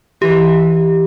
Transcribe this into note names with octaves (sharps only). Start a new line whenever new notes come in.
E3 G4